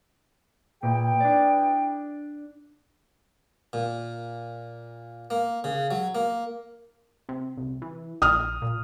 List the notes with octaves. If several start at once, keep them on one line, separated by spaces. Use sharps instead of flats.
A#2 E3 G#4 G5
D4 D5
A#2
A#3
C#3
F#3
A#3
C3
C2
E3
A#1 D#6 F6
A#2